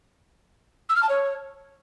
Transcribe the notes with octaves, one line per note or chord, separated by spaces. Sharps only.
E6
F6
A5
C#5